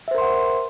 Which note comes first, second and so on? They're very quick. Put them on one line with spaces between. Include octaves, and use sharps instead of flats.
E5 C5 A#4 C6 F#5